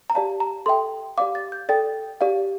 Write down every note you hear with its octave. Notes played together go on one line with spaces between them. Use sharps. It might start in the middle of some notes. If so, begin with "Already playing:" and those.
A#5
G4 D5 F5 A5
A#5
A4 E5 G5 C6
G4 D5 F5 D6
A6
G6
A4 D5 G5 A6
G4 D5 F5